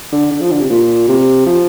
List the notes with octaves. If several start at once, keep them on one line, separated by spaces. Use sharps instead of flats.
D3
D3
F3
D3
C3
A#2
C3
F3